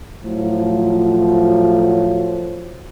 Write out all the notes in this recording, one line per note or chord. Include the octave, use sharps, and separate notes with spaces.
A2 F3 F#3